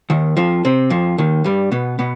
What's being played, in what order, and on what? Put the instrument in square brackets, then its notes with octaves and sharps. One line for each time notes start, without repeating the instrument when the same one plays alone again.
[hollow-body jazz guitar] D#2 D#3
F2 F3
C3 C4
F2 F3
D#2 D#3
G2 G3
B2 B3
B2 B3